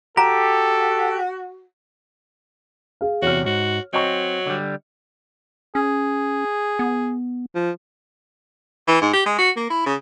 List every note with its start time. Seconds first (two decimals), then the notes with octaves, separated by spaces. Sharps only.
0.17 F#4 G4 A4 A#5
3.01 G#4 F5
3.22 E2 C3 F#4 C#5 F6
3.46 G#2 F#4
3.93 F#3 C4 D#5 C#6
4.47 D3 G3
5.75 C#4 G#4
6.79 B3
7.55 F3
8.88 E3
9.01 G#2
9.13 G4
9.26 G#3
9.38 F#4
9.57 A#3
9.70 E4
9.86 C#3